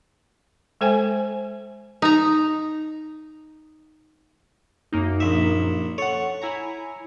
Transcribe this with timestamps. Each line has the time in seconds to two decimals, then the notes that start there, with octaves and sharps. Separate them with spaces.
0.81 G#3 A4 C5 G5 G#5
2.02 D#4 A#5
4.92 F#2 A#3 D#4
5.20 A#1 E5
5.98 A4 C#5 F#5
6.42 E4 G#5 A#5